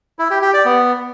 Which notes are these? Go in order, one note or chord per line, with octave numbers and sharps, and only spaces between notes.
E4
G4
G4
D5
B3